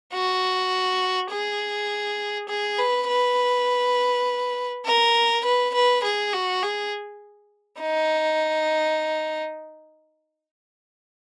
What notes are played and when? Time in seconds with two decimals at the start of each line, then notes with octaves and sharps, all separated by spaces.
0.13 F#4
1.31 G#4
2.49 G#4
2.78 B4
3.08 B4
4.86 A#4
5.45 B4
5.74 B4
6.04 G#4
6.34 F#4
6.63 G#4
7.81 D#4